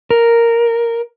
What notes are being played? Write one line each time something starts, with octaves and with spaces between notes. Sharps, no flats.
A#4